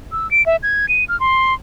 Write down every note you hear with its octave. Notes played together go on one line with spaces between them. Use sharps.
E6
D7
E5
G#6
D#7
F6
C6